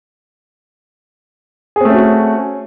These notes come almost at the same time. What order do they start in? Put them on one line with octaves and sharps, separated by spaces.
G#4 C4 A3 C#4 F#4